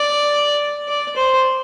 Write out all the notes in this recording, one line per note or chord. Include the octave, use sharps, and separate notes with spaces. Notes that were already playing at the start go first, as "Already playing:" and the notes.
Already playing: D5
D5
C5